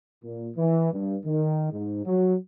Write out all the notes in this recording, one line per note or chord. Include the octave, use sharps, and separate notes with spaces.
A#2
E3
G2
D#3
G#2
F#3